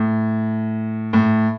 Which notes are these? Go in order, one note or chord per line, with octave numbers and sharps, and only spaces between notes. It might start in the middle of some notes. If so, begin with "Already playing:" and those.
Already playing: A2
A2